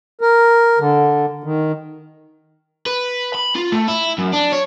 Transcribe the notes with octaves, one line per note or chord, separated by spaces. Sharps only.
A#4
D3
D#3
B4
B5
F4
A3
E4
F#2
D4
C#5